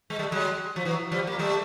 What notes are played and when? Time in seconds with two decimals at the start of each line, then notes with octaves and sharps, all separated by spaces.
0.10 G#3
0.19 G3 A3
0.32 F#3 G#3
0.76 F3
0.85 E3 F#3
1.12 F3 G3
1.27 A#3
1.39 G3 A3